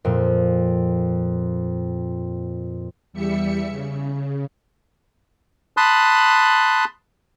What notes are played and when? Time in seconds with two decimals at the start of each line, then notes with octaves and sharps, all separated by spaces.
0.05 F2 A#2
3.13 E2 G3 E5 C#7
3.70 C#3
5.77 A5 B5 C6 D#6 F#6